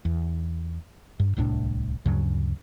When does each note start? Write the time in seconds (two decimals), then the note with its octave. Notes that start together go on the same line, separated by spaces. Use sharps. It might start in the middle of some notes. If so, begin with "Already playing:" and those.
0.05 E2
1.20 G2
1.37 D1 C2 A2 D4
2.06 D2 G2 C#3 F#3